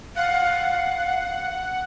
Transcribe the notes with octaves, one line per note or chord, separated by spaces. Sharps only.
F5 F#5